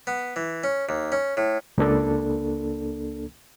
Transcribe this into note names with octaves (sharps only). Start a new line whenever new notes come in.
B3
E3
C#4
D#2
C#4
A2
C#2 A#3 D4 A4